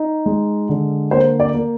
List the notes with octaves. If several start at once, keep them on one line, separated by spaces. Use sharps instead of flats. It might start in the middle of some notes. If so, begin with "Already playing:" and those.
Already playing: D#4
G#3
D3
A#3 C5
D5
A#3